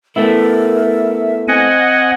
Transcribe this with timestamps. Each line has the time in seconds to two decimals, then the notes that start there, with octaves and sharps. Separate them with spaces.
0.16 A3 B3 E4 A#4 E5
1.48 C4 D#5 F#5 G#5